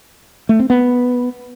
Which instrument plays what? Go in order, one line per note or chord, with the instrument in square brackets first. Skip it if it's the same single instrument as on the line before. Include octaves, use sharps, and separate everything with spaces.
[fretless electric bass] A3
C4
B3